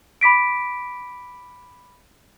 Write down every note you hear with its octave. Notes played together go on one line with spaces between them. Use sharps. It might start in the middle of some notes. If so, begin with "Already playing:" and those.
B5 D6 B6 D7